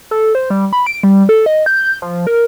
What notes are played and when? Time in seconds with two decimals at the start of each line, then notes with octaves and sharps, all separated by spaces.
0.11 A4
0.35 C5
0.50 G3
0.73 B5
0.86 D7
1.03 G3
1.29 A4
1.46 D#5
1.66 G6
2.02 F3
2.27 A#4